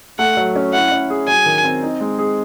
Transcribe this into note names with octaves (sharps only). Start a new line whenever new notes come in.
A3 F#5
F#3
C#4
E4 F#5
C#4
G#4
F#3 G#5
D#3
C4
D#4
G#3
G#4